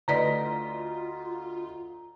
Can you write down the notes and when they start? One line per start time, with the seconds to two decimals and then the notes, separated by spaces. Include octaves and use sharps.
0.08 D2 E4 F4 B4 D5 D#5 A#5 B6